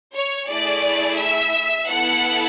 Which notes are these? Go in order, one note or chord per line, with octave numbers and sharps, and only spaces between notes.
C#5
A3 E4 G#4 D5
E5
B3 E4 A4 F#5